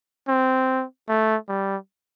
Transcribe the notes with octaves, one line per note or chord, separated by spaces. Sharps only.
C4
A3
G3